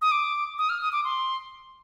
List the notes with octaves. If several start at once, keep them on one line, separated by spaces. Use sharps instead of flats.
D#6
D6
D#6
F6
D#6
D6
C6